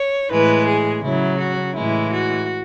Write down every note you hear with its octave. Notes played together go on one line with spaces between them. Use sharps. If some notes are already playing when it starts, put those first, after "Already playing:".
Already playing: C#5
A2 E3 G#3 B4
G#4
C#3 F#3 E4
F#4
A2 E3 G#3 E4
F#4